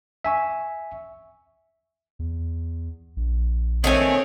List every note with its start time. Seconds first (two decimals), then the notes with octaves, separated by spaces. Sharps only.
0.24 E5 G#5 C#6
2.19 E2
3.16 A#1
3.84 D#3 A3 C4 C#5 G#5